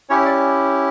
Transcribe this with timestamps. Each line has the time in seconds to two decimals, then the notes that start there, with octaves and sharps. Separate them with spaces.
0.09 C#4 E4 G4 C#5
0.25 D5